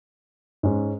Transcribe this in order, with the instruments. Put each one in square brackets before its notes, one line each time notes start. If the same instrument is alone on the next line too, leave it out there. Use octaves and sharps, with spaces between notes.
[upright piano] G#2 G#3 C#4